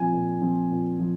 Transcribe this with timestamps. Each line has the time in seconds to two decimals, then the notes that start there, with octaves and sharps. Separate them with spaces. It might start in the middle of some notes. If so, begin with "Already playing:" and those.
Already playing: A#2 F3 C4 G#5
0.13 A#2
0.41 F3 C4
0.71 A#2
0.99 F3